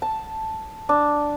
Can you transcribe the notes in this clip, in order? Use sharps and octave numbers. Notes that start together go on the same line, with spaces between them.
A5
D4